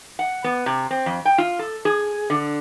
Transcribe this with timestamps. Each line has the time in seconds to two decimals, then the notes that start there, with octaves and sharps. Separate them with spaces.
0.19 F#5
0.44 B3
0.66 C3
0.91 C4
1.06 F2
1.25 G5
1.38 F4
1.59 A4
1.85 G#4
2.30 D3